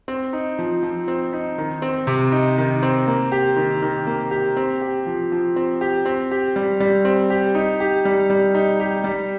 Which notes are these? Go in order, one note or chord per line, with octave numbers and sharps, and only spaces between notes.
C4
D#4
F3
F3
C4
D#4
D#3
C4
C3
D#4
D#3
C4
A#3
G4
D#3
D#3
A#3
G4
C4
G4
F3
F3
C4
G4
C4
G4
G3
G3
C4
G4
D#4
G4
G3
G3
D#4
G4
G3